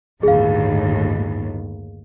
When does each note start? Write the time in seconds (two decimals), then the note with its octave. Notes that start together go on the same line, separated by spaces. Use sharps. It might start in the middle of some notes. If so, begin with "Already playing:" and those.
0.23 G1 D#2 A2 G#4 F5